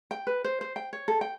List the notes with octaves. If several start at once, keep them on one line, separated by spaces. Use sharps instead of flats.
G5
B4
C5
C5
G5
C#5
A4
G5